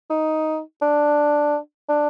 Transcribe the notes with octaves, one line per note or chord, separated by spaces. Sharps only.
D#4
D4
D4